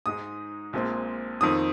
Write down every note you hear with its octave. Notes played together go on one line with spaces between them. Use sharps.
G#2 G#3 D#4 D#6
A#1 A#2 G#3 C4
F2 D#3 C4 D#6